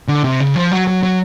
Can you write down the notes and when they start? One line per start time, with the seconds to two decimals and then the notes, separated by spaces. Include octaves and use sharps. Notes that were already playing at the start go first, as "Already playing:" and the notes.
0.08 D3
0.24 C3
0.40 C#3
0.56 F3
0.72 F#3
0.87 F#3
1.03 F#3